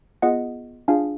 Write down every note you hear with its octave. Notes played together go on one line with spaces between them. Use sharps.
B3 F4 G#4 D#5 F#5
D4 F4 G#4 F5 G#5